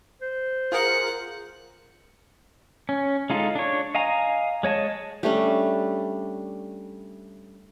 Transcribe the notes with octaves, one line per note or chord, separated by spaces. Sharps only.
C5
F4 G#4 A#4 F#5
C#4
G#3 D#4 F4 A4
D4 C#5
D#5 F5 G#5 A#5
G#3 C#5 D#5 A5
G3 A3 C#4 D4